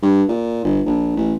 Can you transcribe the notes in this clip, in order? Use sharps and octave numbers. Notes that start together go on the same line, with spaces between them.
G2
A#2
G1
A#1
A1